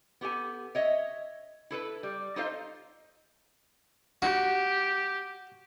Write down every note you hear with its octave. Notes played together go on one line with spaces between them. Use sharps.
B3 G4 A4 G#5
C#5 D#5 E5
E4 A4 B4
G3
D#4 F4 A4 C5 D#5 F5
F#4 G4